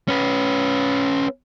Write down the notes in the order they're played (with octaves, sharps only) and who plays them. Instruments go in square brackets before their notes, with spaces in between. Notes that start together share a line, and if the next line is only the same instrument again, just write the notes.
[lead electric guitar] C#4 B4